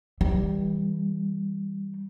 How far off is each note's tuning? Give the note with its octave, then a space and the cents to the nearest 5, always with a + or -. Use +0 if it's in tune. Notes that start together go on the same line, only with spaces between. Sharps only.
E3 -30 G3 +5